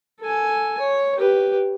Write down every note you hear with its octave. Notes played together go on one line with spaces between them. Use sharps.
A4 G#5
C#5
G4 B4